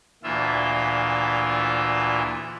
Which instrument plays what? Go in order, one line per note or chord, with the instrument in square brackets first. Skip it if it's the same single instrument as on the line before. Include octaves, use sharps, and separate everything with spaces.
[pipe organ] D2 A#2 E3 F4 E5